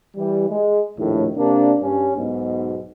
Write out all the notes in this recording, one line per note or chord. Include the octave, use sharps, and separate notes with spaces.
E3 G3
G#3
A#1 D#2 A2
C3 A#3 D4
G2 C#4
B1 G#2 B2 G#3